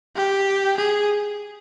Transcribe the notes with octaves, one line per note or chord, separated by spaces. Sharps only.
G4
G#4